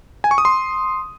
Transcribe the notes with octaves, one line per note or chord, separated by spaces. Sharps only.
G#5
C#6
D#6
C6